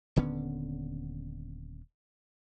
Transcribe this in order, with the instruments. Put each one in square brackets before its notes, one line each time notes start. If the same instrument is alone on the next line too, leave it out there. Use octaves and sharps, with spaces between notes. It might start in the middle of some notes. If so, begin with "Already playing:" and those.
[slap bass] D#1 D3 B3 C#4